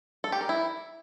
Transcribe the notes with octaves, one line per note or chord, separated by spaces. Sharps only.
A4
G4
A#4
E4